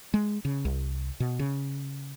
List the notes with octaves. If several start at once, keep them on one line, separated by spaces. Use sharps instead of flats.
G#3
C#3
C2
B2
C#3